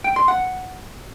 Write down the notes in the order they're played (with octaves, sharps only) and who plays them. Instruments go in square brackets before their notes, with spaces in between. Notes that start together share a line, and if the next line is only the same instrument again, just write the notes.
[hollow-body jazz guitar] G5
C6
F#5